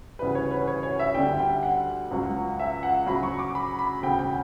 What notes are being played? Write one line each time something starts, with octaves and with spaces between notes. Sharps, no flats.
D2 C#3 E3 G3 B4
C#5
B4
C#5
C#5
E5
D2 D3 G3 G5
G5
F#5
C#2 C#3 F#3
E5
F#5
D2 C#3 F#3 B5
C#6
D6
B5
B5
E1 D2 C#3 G5
G5